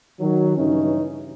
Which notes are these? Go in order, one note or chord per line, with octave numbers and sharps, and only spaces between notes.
D#3 F#3
G2 C#3 E3 C#4 D#4